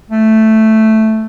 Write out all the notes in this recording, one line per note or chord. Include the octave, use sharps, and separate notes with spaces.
A3